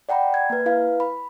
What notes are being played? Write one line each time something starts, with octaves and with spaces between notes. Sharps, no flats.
D5 F#5 G5 A#5 B5
G#6
A#3 B4
E4 B4 F5
B5